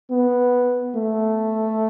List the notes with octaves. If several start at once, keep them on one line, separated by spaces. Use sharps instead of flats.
B3
A3